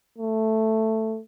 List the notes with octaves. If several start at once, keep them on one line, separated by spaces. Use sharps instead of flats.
A3